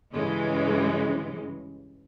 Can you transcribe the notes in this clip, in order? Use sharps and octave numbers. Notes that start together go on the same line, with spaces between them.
G2 C#3 E3 G#3